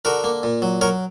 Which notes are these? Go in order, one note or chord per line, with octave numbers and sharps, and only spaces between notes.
D3 F#4 A#4
A#3
A#2
F#3
F#3 A#4 C#5